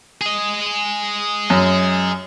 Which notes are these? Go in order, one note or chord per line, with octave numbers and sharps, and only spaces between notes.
G#4 D#5
F#2